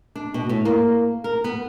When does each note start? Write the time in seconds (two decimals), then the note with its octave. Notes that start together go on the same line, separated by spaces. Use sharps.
0.16 D4
0.34 B2
0.49 A2
0.65 A#3
1.24 A#4
1.44 B3